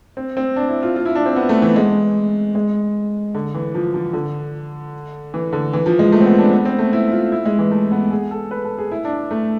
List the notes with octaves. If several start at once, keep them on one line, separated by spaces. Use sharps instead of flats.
C4
C4
D4
E4
F4
F4
E4
D4
C4
B3
A3
E3
G#3
G#3
D3
E3
F3
F3
D3
E3
D3
E3
F3
G#3
A3
C4
B3
D4
B3
C4
A3
E4
F4
E4
G#3
E3
A3
B3
G#4
A4
B4
A4
G#4
E4
D4
A3